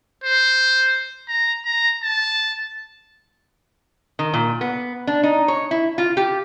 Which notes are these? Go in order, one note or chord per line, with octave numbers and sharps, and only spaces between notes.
C5
A#5
A#5
A5
D#3
A#2
B3
D4
D#4
C#5
E4
F4
G4